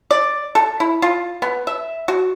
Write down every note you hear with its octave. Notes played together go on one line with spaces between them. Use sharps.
D5
A4
E4
F4
B3
E5
F#4